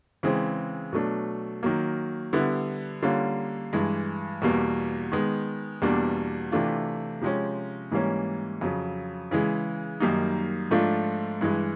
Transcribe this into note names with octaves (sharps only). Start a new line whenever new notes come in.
C#3 E3 G#3 C4
B2 F#3 A3 D4
D#3 F#3 A#3
D3 G3 B3 E4
D3 G3 A#3 C#4 F4
G2 E3 G#3
E2 B2 G3 A#3
D#3 G#3 B3
E2 B2 G3 A#3 D4
C3 E3 A3 D4 F4
C3 F3 G#3 C#4
G#2 E3 G3 A#3 C#4
F2 C#3 F#3
C#3 E3 G#3
F#2 D#3 G3 A#3 D#4
G#2 F3 A3 D4 F4
G2 E3 G#3